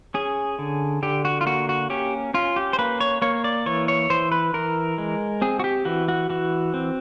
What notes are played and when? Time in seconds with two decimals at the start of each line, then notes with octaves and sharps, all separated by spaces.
0.14 C#4 G#4
0.59 D3
1.03 D3 G4
1.25 F#4
1.41 F4
1.46 A#3 F#4
1.69 F#4
1.90 C#4 G4
2.34 C#4 F4
2.56 G4
2.73 C5
2.79 A#3 B4
3.00 C#5
3.22 A#3 C#5
3.44 D5
3.66 E3 C#5
3.88 C#5
4.10 E3 C5
4.32 B4
4.54 E3 A#4
4.98 G#3
5.42 C4 G#4
5.60 F#4
5.64 G4
5.85 E3 F#4
6.09 F#4
6.30 E3 F#4
6.74 C4